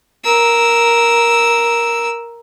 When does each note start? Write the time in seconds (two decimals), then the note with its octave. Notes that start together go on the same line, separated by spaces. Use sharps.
0.25 A#4 E6